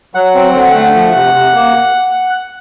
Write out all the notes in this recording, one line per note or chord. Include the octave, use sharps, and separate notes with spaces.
F#3 F#5
C4
D3
A3
F3
C3
C3
A#3